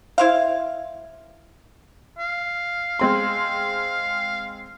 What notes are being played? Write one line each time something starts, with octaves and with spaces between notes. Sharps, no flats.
E4 C5 F5
F5
G#3 C4 C6